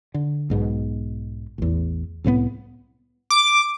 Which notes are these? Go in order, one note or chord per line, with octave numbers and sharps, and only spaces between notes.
D3
B1 G#2 B2
A1 E2
C2 A2 F3 B3
D6